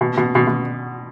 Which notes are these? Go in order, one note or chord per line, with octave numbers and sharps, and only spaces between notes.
B2
B2
B2
B2